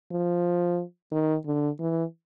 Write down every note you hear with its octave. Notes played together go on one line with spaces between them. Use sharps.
F3
D#3
D3
E3